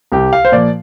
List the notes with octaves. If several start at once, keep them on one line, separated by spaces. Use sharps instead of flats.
C2 G4
F5
C5
A#2 F3 D5